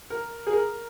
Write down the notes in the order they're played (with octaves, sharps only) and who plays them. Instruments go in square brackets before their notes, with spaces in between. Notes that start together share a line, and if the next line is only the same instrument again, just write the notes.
[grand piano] A#4
G#4
A#4